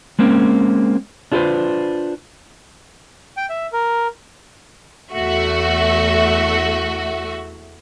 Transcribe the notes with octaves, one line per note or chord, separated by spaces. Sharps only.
G#3 A#3 C4 C#4
D4 F4 G#4 A4 B4 C5
G5
E5
A#4
E2 A3 F#4 E5